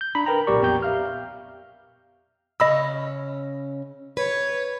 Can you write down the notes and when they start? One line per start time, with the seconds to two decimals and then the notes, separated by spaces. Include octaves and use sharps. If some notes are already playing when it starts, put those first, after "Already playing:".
0.01 G6
0.15 D4 A#5 B5
0.26 A#4 B4 G5 A#5
0.47 B1 A#2 G4 A#4 D5 C#6
0.62 F2 B3 G4 G5 A#5 G6
0.83 E5 F5 F6
2.60 C#3 C#4 D#5 B5 E6
4.17 B4 C#5